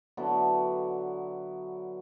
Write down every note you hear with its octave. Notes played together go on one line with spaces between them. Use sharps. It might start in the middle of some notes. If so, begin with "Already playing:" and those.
D3 F#3 B3 E4